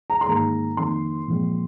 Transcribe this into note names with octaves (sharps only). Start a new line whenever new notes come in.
A#5
C6
G#2 D#3 A#3 A#5
F2 D#3 A#3 C6
A#2 F3 G#3 C4